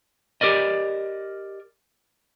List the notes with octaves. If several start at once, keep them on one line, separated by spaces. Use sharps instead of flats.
G4 A#4 D5 D#5